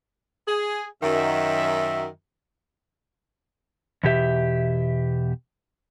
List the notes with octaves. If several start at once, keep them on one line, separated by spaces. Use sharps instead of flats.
G#4
F#2 D#3 E5
E2 B2 G4 E5